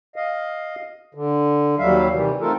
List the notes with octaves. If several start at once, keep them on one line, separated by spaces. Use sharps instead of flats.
D#5 F5
D3
D#2 F#3 G3 E5 F5
C3 D#3 E3 G3
A3 C4 D#4 F4 A4 A#4